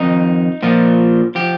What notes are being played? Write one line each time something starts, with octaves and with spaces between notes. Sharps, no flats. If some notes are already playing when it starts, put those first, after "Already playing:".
Already playing: F2 D#3 D#4
A#2 F3
F3 G4